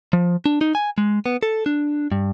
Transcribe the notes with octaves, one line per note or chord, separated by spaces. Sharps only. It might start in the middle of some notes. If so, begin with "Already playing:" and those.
F3
D4
D#4
G#5
G#3
B3
A4
D4
G2